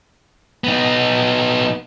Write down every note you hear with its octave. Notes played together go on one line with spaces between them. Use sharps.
B3 D#4